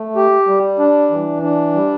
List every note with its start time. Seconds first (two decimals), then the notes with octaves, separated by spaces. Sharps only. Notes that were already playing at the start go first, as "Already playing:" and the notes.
Already playing: A3
0.16 G4
0.47 G3
0.79 D4
1.10 E3
1.43 D4
1.74 G3